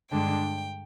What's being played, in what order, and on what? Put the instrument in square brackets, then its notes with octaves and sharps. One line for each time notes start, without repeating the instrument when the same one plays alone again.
[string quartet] G2 D3 G#3 D4 G5